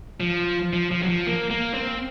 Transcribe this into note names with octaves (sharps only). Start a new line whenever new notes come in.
F3
F3
F3
F#3
F3
A#3
A#3
C4